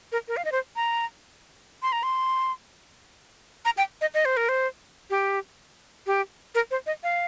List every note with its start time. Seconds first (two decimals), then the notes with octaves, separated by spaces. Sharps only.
0.12 A#4
0.28 A#4
0.37 F5
0.45 D#5
0.52 C5
0.76 A#5
1.83 C6
1.92 A#5
2.03 C6
3.65 A#5
3.77 G5
4.01 D#5
4.14 D#5
4.25 C5
4.37 A#4
4.49 C5
5.10 G4
6.06 G4
6.55 A#4
6.71 C5
6.86 D#5
7.03 F5